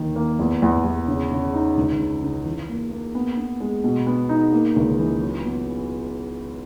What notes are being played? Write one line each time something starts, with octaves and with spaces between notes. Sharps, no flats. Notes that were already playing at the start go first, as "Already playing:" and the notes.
Already playing: D#2 D#3
A#3
E2
E2
E2
C#3
C#3
D#4
C#2
C#3
C#3
E3
A#3
A#3
B3
B3
G#3
B2
B3
D#4
A#3
C#2
E3
F#3
B3